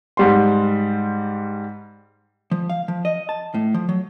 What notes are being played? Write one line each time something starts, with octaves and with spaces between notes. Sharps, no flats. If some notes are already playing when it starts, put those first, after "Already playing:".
G#2 G3 C6
F3
F5
F3
D#5
A5
A2
F3
F#3